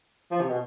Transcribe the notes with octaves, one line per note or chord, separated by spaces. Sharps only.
F3
C3
B2